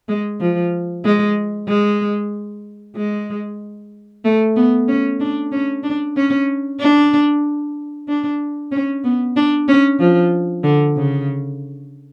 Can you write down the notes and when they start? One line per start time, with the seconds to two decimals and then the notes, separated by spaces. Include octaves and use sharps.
0.09 G#3
0.40 F3
1.05 G#3
1.68 G#3
2.96 G#3
4.25 A3
4.56 B3
4.88 C#4
5.20 D4
5.52 C#4
5.83 D4
6.17 C#4
6.80 D4
8.08 D4
8.72 C#4
9.04 B3
9.36 D4
9.68 C#4
9.99 F3
10.64 D3
10.96 C#3